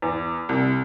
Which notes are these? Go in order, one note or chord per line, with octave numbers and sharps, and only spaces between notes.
E2
C2